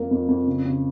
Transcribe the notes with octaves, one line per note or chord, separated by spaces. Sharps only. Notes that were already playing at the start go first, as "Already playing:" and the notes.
Already playing: F2 A#3
F2
F2
C#3
C#3